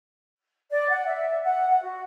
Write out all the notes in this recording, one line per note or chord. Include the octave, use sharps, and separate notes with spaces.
D5
F#5
E5
F#5
F#5
F#4